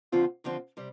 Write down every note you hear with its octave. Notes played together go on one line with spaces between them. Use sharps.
D#2 D3 F3 C4 F4
D#2 D3 F3 C4 F4
C3 G3